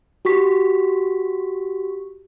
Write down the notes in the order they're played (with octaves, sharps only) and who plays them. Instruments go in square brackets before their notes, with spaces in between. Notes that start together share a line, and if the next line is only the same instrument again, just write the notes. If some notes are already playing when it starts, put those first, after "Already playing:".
[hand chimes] F#4 G4 C#6 B6